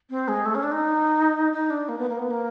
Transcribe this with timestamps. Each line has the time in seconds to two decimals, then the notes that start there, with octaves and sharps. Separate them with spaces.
0.10 C4
0.28 G#3
0.46 A3
0.55 C#4
0.63 D4
0.72 D#4
1.53 D#4
1.70 D4
1.89 A#3
1.99 B3
2.09 A#3
2.19 B3
2.31 A#3